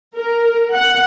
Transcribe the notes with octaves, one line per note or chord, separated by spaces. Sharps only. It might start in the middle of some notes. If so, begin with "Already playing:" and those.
A#4
F#5